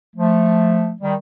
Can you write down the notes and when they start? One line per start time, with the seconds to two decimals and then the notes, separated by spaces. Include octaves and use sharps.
0.15 F3 A3
1.01 D#3 G3